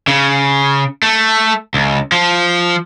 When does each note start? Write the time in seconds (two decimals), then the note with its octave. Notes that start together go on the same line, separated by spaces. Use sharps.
0.07 C#3
1.02 A3
1.74 C#2
2.12 F3